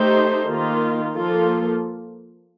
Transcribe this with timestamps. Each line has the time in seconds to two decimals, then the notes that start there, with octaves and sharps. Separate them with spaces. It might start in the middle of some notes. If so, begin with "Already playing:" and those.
Already playing: A3 D#4 G4 C5
0.48 D#3 A#3 F4
1.15 F3 A#3 F4 A4